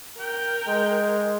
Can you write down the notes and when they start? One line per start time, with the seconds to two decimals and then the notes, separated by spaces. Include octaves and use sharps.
0.20 A#4 G5
0.67 G#3